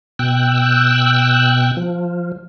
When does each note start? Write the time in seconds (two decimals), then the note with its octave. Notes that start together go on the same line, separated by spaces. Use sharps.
0.19 B2 G5 E6 F#6
1.77 F3